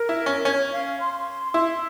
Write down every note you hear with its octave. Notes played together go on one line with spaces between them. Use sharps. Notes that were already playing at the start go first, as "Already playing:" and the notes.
Already playing: A#4
E4
C#4
C#4 C#5
F5
C6
E4 C6